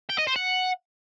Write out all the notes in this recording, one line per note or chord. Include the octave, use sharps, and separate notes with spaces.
G5
D#5
C5
F#5